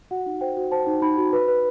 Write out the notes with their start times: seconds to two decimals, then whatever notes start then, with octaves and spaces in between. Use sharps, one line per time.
0.11 F#4 F#5
0.26 D#4
0.41 C5 G5
0.57 F#4
0.72 C5 A5
0.87 D#4
1.02 D#4 B5
1.18 F#4
1.33 B4
1.48 B4